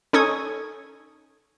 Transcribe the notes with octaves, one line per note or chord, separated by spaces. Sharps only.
C#4 D#4 A4 C#6 D#6 G#6